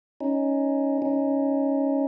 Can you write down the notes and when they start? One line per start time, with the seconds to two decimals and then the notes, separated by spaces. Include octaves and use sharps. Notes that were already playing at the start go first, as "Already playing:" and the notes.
0.21 C#4 D#4
1.02 C#4 D#4